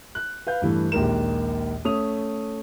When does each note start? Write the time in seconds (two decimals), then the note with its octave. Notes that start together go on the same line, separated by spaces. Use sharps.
0.15 F#6
0.47 B4 F5 G6
0.62 G2 E3 A3
0.92 A#1 D#2 D#3 G#3 A#4 E7
1.85 A3 C#4 D#6 F7